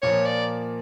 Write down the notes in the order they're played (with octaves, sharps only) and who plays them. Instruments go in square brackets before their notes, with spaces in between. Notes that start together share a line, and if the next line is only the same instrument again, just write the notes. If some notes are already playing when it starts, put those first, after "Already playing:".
[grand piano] A#2 F3 A#3 [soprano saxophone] C#5
[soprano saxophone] D5